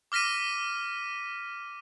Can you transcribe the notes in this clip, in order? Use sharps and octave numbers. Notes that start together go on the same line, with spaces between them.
D6 F6 A#6 B6 D#7